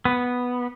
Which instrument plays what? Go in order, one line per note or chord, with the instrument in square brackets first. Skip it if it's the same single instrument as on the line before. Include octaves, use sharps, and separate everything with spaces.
[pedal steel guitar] B3